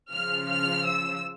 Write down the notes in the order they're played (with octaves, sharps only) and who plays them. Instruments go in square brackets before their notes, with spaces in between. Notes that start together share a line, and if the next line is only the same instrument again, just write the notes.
[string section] C#3 F3 F6
F6
E6